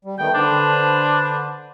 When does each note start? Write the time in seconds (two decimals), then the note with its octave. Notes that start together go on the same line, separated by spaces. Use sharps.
0.05 G3
0.19 D#3 A3 B3 G5
0.34 D3 D4 B4 C5